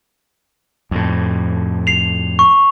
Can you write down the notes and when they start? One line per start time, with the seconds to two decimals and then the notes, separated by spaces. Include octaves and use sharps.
0.91 F2 A2
1.87 C7 F7
2.39 C#6